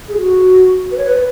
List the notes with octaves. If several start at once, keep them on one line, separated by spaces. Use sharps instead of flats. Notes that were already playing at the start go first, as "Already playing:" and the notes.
G#4
F#4
B4
C#5
B4